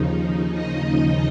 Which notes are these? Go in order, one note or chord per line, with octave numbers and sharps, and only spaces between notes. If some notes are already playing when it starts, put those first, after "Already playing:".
Already playing: D#2 C#3 F3 D#4
D#5